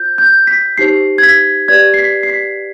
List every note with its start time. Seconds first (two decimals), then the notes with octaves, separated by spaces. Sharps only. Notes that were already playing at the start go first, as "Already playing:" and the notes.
Already playing: F4 C5 G6
0.18 G6
0.47 B6
0.78 D#4 G4 C5 C7
1.18 G#6
1.23 B6
1.68 G4 B4 D5 G#6
1.94 C7
1.99 B6
2.23 C7
2.29 B6